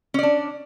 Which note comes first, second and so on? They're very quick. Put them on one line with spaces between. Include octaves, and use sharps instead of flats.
C#4 D5 D4